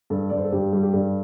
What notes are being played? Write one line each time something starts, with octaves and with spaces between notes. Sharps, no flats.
G2 A4
G2 D5
C5
A4
G2 G4
G3 G4
G4
G2 A4